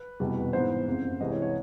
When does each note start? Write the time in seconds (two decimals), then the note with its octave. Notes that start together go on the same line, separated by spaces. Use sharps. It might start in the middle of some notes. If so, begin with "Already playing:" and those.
Already playing: B4
0.20 F1 E2 B2 G3 B3
0.53 G#2 E3 G#3 B3 C5
0.87 F#1 F2 C#3
1.20 C2 C3 E3 G#3 D#5
1.31 C#5
1.42 C#5